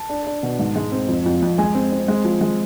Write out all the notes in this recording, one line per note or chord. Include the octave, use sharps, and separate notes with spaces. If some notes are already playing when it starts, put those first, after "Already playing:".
Already playing: A5
D4
D4
B2
G#2
G#3
C4
F2
F2
F2
G#3 G#5
C4
C4
G#3
F3
G#3